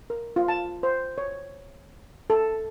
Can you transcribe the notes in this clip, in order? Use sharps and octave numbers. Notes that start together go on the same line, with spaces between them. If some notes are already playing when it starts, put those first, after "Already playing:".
A#4
F4
A5
C5
C#5
A4